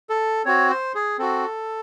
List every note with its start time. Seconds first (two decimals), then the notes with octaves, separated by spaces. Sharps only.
0.10 A4
0.45 C4 F#4 C#5
0.70 C5
0.95 G#4
1.19 C4 F#4 A4